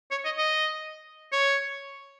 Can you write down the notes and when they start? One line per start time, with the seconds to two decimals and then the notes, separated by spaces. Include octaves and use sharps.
0.11 C#5
0.25 D#5
0.38 D#5
1.32 C#5